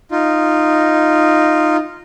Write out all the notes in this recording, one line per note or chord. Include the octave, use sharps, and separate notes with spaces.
D#4 F4